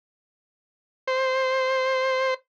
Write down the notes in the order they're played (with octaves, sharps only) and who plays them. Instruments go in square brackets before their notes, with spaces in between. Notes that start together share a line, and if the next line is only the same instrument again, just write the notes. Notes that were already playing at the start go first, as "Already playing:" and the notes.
[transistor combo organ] C5